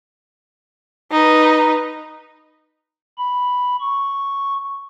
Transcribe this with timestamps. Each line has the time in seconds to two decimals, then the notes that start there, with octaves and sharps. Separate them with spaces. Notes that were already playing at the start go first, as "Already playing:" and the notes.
1.12 D#4 B4
3.18 B5
3.81 C#6